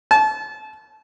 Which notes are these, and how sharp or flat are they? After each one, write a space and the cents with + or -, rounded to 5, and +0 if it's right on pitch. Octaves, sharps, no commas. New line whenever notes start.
A5 -30